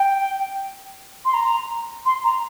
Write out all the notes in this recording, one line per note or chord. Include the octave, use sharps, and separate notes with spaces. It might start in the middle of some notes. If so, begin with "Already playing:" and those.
Already playing: G5
C6
A#5
C6
A#5